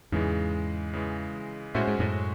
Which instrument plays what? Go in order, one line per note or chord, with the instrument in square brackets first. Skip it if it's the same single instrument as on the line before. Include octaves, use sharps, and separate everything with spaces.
[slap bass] E2 G#2 [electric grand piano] C#3 E3 G#3
[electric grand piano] C#3 E3 G#3
[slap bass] A2 [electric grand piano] G#3 C#4 F#4 C5 E5
[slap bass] G#2
F#2 A2